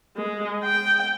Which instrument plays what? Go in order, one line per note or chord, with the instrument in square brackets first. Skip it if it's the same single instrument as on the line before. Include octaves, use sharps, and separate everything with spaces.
[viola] G#3
G5